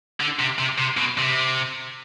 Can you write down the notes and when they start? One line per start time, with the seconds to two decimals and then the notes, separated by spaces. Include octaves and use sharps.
0.20 D3
0.39 C3
0.59 C3
0.78 C3
0.97 B2
1.18 C3